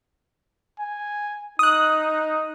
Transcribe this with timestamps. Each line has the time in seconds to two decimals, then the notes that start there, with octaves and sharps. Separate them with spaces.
0.80 G#5
1.59 D#4 D#6 F#6